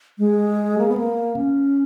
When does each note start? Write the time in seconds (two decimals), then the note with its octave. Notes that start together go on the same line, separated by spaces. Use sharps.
0.19 G#3
0.78 A#3
0.88 B3
0.97 A#3
1.36 C#4